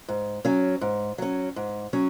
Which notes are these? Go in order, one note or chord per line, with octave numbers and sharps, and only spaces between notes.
G#2
F#3 C#4
G#2
F#3 C#4
G#2
F#3 C#4